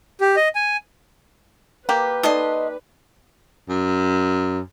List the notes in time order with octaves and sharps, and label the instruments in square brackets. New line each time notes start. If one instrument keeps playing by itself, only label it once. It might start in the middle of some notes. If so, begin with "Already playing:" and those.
[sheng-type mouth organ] G4
D#5
G#5
[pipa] A#3 G4 [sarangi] B4
[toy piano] D#4 A4 D5 [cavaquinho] D#5 A5 C6
[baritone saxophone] F#2